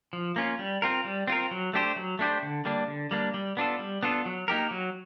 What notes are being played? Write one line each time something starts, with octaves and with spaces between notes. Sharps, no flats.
F3
A#3 C#4 F4
G3
C4 F4 A#4
G3
C4 F4 A#4
F#3
A3 D4 G4 C5
F#3
A3 D4 G4 C5
D3
G3 A#3 D4
D3
G3 A#3 D4
G3
B3 D4 F4 A4
G3
B3 D4 F4 A4
F#3
A#3 D#4 G4 A#4
F#3